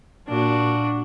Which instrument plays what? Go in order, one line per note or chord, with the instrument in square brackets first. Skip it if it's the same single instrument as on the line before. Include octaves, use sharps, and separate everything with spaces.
[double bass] A#2 [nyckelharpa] D4 F#4